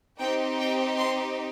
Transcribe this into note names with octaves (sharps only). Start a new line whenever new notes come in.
C4 D#4 G4 G5
G5
C6